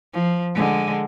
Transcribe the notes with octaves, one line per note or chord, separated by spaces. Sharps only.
F3
D3 G#3